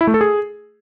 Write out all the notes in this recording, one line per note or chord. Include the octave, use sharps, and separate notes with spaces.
E4
A3
A4
G#4